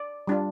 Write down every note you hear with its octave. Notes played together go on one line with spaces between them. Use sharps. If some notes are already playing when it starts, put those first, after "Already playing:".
Already playing: D5
G3 D4 F4